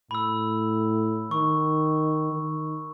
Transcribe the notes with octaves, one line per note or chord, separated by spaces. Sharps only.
A2 B5 E6
D#3 C#6
D#3